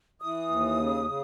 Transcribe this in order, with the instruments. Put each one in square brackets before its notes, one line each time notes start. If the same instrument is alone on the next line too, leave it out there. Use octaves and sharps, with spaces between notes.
[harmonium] E3 [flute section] D#6
[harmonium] D#2
C#3
C#3